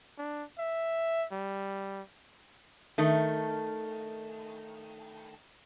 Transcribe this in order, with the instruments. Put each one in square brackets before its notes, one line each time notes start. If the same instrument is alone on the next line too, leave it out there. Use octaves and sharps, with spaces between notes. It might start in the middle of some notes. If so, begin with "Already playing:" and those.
[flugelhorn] D4
E5
G3
[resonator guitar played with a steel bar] D#3 A3